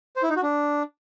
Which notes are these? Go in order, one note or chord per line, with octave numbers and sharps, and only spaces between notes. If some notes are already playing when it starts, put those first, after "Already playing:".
C5
E4
D#4
F#4
D4